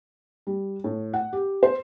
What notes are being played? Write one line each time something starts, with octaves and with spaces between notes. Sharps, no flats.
G3
A2
F#5
G4
C5